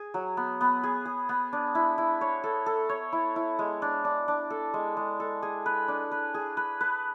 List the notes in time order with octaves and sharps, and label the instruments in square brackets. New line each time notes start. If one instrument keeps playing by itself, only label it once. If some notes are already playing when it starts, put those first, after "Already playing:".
Already playing: [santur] G#4
F#3
B3
B3
G#4
G#4
B3
D4
E4
E4
C#5
A4
A4
C#5
E4
E4
G#3
D4
D4
D4
A4
G#3
G#3
A4
G#4
B4
D4
B4
G#4
B4
B4